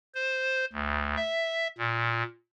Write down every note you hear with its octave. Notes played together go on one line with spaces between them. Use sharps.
C5
D2
E5
A#2